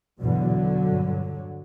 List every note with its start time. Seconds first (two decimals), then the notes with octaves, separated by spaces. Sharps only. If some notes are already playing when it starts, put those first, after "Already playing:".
0.21 E2 B2 D3 F#3
0.85 G2